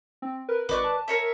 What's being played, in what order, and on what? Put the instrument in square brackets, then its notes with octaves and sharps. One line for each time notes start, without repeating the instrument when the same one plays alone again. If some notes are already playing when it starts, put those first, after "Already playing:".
[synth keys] C4
A#4 B4
[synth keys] G#1 D#5 C#6 [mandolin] B4 D5 F#6
[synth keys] A5
[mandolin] A#4 C#5 E5